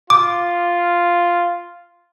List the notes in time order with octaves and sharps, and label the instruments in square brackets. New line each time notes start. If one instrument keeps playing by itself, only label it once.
[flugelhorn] F4 [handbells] D6